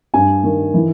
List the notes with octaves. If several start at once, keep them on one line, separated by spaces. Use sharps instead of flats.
G2 G#5
D#3
E3